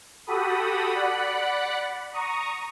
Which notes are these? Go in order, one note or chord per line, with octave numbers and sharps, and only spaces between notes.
F#4 G4 A4 B5 D#6
D5 F#5 B5 F#6
A#5 C#6 D#6